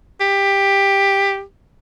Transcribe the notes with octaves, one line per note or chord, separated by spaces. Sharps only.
G4